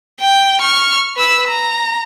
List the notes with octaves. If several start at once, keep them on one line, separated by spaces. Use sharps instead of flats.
G5
C#6 F6
B4 E6
A#5